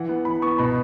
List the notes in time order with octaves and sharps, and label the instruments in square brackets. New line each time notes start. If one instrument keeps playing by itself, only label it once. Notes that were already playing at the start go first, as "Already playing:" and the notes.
Already playing: [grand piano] E3 F#5
B3
E3 B5
B3 C#6
B2 B5